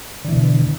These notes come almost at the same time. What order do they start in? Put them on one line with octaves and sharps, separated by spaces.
D3 E3 B2